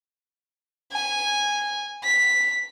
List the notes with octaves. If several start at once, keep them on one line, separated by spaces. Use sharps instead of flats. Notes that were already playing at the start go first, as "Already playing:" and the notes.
G#5
B6